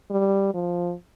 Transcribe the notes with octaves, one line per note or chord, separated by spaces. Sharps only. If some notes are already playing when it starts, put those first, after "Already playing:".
G3
F3